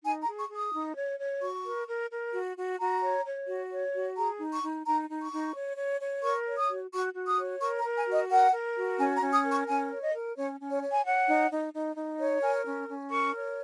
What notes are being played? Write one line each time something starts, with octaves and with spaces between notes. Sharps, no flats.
D#4 G#5
A#5
G#4
C#6
G#4
D#6
D#4
C#5
C#5
F#4 C#6
A#4
A#4
A#4
F#4
F#4
F#4 A#5
C#5
C#5
F#4
C#5
F#4
G#4 A#5
D#4
C#6
D#4
D#4 A#5
D#4
C#6
D#4
C#5
C#5
C#5
A#4 C#6
C#5
D#6
F#4
F#4 C#6
F#4
D#6
C#5
A#4 C#6
A#5
A#4
G#5
F#4
D#5
A#4 F#5
A#4
F#4
C#4 G#5
A#5
C#4
D#6
A#4
C#6
C#4 G#5
C#5
D#5
A#4
C#4 C#5
C#4
C#5
C#5
G#5
C#5 F#5
D#4
D#4
D#4
D#4
C#5
A#4 G#5
C#4
C#4
A#4 C#6
C#5